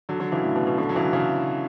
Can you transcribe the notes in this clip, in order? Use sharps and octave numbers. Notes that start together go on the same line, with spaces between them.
D3 F#3
D3 F#3
C#3 E3
A2
B2
B2
B2 D3
F#3
C#3 E3
C#3 E3